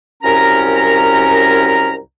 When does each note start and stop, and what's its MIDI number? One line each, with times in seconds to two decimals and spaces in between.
0.23 1.96 36
0.23 1.96 42
0.23 1.96 61
0.23 1.96 70
0.23 1.96 82